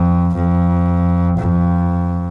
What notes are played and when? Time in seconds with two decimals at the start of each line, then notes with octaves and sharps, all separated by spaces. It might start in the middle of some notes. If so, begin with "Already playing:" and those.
Already playing: F2
0.35 F2
1.39 F2